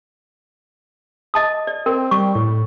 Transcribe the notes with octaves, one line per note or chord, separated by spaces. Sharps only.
D#5 A5 D#6
D5
C4 A#4
G3 C#6
A2